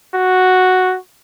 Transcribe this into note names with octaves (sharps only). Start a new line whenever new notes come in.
F#4